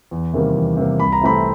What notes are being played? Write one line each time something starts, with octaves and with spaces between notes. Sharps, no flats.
E2
C3 D#3 G3 A#3
E2
C3 D#3 G3 A#3
C2 B5
A#5
C3 E3 A3 C4 B5